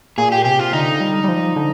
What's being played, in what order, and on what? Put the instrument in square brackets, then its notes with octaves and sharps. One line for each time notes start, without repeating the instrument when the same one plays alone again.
[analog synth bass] A#2 [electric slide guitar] G#4
[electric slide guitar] G4
[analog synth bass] C3 [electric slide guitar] G4
[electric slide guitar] F4
[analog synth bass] D3 [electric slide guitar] D#4
[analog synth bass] G3
G3
F3
D3